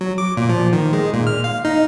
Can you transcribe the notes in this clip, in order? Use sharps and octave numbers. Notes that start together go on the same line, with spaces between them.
F#3
D6
A#2
F3
D#3
G#3
A#2
F6
F5
D#4